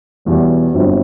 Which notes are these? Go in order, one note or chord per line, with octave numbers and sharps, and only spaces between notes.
E1 E2 B2 G3
G1 G2 F#3 C4